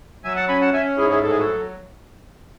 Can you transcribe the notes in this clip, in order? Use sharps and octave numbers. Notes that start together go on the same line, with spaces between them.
F#3 E5 G#5
F#5 A5
C#4 G#5 B5
F#5 A5
C#4 E5 G#5
G#2 E4 G#4
E4 G#4
A2 A4
G#4
F#4 A4
F#3